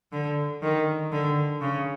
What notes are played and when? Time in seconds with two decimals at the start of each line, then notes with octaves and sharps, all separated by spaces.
0.12 D3
0.62 D#3
1.12 D3
1.61 C#3